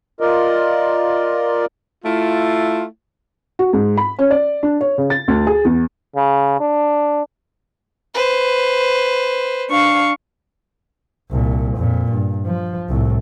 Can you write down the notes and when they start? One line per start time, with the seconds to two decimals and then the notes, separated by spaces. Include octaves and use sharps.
0.21 F4 A#4 D5 D#5
2.05 A3 E4 F4
3.59 F#4
3.73 G#2
3.98 B5
4.19 C#4
4.31 D5
4.63 D4
4.81 C#5
4.98 C#3
5.10 A6
5.28 D2
5.47 G#4
5.65 E2
6.16 C#3
6.60 D4
8.14 B4 C5
9.70 D4 F5 C#6
11.31 C2 A#2
11.77 F2 A#2
12.11 G2
12.46 F3
12.89 C2 A2